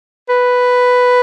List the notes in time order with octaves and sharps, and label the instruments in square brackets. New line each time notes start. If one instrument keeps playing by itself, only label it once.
[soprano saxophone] B4